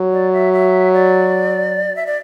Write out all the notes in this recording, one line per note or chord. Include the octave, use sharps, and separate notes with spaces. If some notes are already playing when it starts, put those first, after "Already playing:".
Already playing: F#3
D5
E5
E5
D5
E5
D5